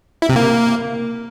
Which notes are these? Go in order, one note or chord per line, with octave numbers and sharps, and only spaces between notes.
E4
C3
A#3